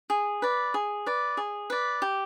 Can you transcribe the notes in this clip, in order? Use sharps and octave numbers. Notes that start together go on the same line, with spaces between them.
G#4
B4 D5
G#4
B4 D5
G#4
B4 D5
G4